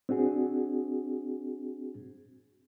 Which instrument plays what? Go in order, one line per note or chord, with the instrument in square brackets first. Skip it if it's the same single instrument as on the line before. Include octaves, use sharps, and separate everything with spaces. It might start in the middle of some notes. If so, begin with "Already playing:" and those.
[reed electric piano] C4 D4 F#4 G#4